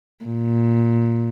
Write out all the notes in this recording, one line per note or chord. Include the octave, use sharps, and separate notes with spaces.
A#2